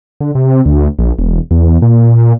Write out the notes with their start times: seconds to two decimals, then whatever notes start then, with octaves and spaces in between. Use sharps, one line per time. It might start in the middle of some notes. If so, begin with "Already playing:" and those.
0.21 D3
0.35 C3
0.66 D2
0.99 A#1
1.19 E1
1.51 E2
1.82 A#2